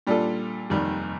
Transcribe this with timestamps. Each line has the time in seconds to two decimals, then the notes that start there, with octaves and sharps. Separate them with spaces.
0.07 A#2 G3 D4 F4 A4
0.70 F1 D#2 D#3 G3